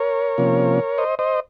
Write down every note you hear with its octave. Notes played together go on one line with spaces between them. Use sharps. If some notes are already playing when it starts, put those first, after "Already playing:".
Already playing: A#4 C#5
C3 F3 A#3 C#4
C5 D#5
C5 D#5